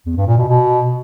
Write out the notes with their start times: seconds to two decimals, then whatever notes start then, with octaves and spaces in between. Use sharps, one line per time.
0.06 E2
0.16 G2
0.27 A#2
0.37 B2
0.48 B2